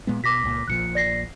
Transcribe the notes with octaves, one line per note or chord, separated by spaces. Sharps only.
A#2 G#3 B3
B2 D6 A#6 B6
C#2 A#2
A#1 A#2 F3 F#6 C#7
D5 A#6 C7